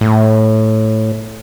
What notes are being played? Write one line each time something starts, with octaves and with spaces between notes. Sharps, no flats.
A2